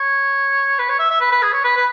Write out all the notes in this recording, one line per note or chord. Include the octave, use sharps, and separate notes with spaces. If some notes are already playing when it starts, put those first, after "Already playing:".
Already playing: C#5
B4
C#5
E5
E5
B4
B4
G#4
C#5
B4
B4